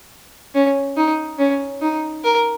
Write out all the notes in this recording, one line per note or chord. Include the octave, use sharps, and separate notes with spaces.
C#4
D#4
C#4
D#4
A#4